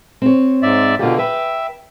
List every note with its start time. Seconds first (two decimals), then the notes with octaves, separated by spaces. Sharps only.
0.22 C4 C#5
0.63 G#2 D5 E5
0.99 B2 D3 A#3 F4 G4
1.18 B4 E5 G5